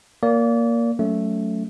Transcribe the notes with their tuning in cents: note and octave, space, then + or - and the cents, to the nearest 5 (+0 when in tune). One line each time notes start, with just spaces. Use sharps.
A#3 +0 D5 -30
F#3 +5 A3 +0 C#4 +25